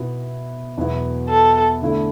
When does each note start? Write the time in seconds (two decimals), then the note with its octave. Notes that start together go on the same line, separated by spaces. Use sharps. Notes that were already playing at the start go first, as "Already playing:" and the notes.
Already playing: B2 B3 E4
0.77 E2 B2 F#3 B3 E4
1.30 A4
1.82 D3 A3 E4